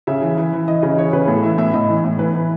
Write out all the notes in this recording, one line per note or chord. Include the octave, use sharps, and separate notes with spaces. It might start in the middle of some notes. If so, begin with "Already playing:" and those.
C#3 E5
E3
E3
E3
E3 D#5
C#3 D#5
E3 C#5
C#3 B4
A2 A4
E3 E5
A2 E5
A2 D#5
E3
A2
E3 B4
E3